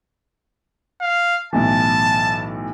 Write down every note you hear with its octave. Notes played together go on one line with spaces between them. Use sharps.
F5
B1 A2 E3 A5